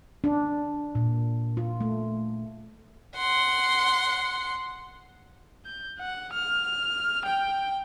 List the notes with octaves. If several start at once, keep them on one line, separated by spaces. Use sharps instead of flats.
D4
A#2
F4
A3
F#5 C6
G6
F#5
F6
G5